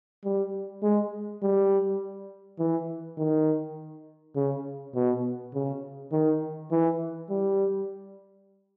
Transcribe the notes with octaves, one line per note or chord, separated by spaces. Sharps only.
G3
G#3
G3
E3
D#3
C#3
B2
C#3
D#3
E3
G3